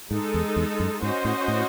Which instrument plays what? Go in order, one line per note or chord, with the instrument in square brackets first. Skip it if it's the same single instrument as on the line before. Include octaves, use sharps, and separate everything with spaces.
[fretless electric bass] G#2 [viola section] G#3 D#4 A4
[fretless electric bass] E2
E2
F#2
[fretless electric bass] G#2 [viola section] C#4 F#4 C5 D#5
[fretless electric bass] A2
A2